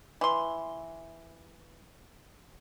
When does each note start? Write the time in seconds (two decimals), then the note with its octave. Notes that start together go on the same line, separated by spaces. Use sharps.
0.21 E3 C6